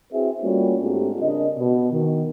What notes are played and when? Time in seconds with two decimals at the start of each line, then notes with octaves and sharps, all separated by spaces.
0.12 C4 E4 F#4 G#4 B4 E5
0.42 G3 A3 A#3 C#4 F4 F#4
0.81 G#2 A3 C4 D4 F4 G4
1.21 C#3 D4 A#4 D#5
1.59 B2
1.92 D#3